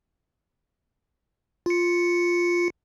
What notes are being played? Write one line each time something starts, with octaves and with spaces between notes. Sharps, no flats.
F4 C#7